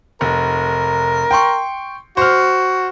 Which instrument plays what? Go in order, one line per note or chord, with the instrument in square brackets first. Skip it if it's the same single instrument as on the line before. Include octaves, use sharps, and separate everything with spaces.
[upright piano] F1 [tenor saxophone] A#4
[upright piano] G5 C6 C#6
[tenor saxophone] F#4 [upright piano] C5 F6